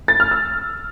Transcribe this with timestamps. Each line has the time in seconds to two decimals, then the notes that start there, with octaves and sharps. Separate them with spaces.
0.08 A6
0.20 F6
0.31 E6